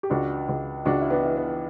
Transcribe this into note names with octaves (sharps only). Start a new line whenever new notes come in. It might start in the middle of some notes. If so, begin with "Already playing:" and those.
G4
C#2 D4 F#4
C#2
C#2 D4 F#4
E4
B3 D4
E3
B3